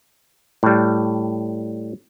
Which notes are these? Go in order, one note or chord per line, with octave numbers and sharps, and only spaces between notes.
A2 G3